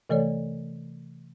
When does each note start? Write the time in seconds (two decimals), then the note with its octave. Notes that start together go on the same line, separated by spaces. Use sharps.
0.09 C3 E3 A3 A4 C#5 D5